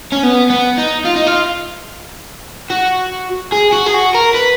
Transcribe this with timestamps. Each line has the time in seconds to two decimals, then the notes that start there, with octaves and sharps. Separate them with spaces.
0.12 C#4
0.23 B3
0.50 B3
0.78 D#4
1.05 F4
1.16 D#4
1.27 F4
2.71 F#4
3.52 G#4
3.73 F#4
3.86 G#4
3.94 F#4
4.15 A#4
4.35 B4